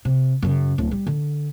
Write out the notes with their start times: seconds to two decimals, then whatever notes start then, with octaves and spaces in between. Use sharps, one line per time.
0.05 C3
0.42 F#2 C#3
0.78 D1 A2
0.91 G3
1.07 D3